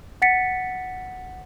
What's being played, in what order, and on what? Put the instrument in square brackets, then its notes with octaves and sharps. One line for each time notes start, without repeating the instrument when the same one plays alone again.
[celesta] F#5 A6 B6 C#7